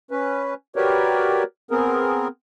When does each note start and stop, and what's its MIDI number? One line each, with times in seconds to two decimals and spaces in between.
0.11 0.54 61
0.11 0.54 71
0.76 1.43 66
0.76 1.43 67
0.76 1.43 70
0.76 1.43 71
0.76 1.43 73
0.76 1.43 74
1.71 2.28 59
1.71 2.28 60
1.71 2.28 68
1.71 2.28 70